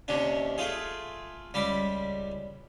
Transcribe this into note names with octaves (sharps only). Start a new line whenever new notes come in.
D#2 C3 C#4 D4
A3 F4 G#4
C#2 G3 D5 B5